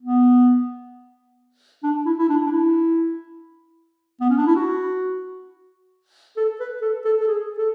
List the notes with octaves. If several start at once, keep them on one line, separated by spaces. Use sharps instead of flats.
B3
D4
E4
E4
D4
D4
E4
B3
C#4
D4
E4
F#4
A4
B4
A4
A4
A4
G#4
A4